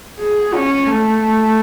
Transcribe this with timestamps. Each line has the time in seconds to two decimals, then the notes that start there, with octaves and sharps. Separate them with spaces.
0.19 G#4
0.54 C#4
0.87 A3